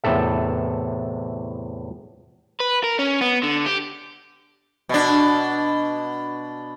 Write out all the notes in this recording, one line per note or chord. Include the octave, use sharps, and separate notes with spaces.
E2 A2 C3 A4 E5
B4
A#4
C#4
B3
D3
G4
B2 D4